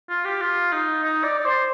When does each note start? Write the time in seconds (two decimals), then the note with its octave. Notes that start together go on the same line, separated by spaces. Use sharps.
0.09 F4
0.25 G4
0.41 F4
0.72 D#4
1.04 D#4
1.24 D5
1.39 D5
1.45 C5